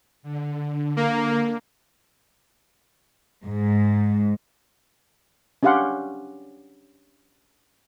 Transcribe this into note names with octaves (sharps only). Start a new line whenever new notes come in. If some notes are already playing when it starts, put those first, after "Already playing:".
D3
A#3
G#2
C#4 D4 G4 F5 F#5 C6